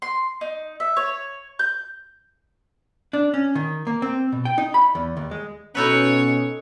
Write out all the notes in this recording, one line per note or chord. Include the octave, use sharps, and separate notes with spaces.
C6
D#4
E5
C#5
G6
D4
C#4
D#3
A#3
C4
B2
G5
D#4
B5
E2
D#2
G#3
B2 C#4 D#4 A4 B4 C#5